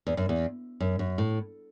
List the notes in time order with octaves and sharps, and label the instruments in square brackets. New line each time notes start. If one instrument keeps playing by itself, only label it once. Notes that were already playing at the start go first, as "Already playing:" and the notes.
[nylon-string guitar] E2
F#2
E2
F#2
F#2
A2